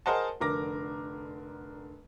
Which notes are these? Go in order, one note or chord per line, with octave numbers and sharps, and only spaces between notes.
G#4 A#4 C5 D#5 F#5 A5
F1 D3 A#4 D6 A#6